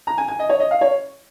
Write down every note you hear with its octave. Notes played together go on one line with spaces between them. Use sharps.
A#5
G#5
G#5
D#5
C#5
D#5
F5
C#5